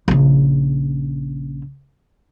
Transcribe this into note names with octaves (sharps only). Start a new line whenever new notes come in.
A#1 C#3